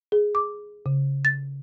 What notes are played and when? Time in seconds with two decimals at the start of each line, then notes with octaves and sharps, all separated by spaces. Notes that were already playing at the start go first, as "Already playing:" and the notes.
0.12 G#4
0.35 D6
0.86 C#3
1.25 A6